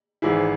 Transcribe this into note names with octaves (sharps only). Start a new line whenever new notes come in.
G#1 G#2 E3 E4 G#4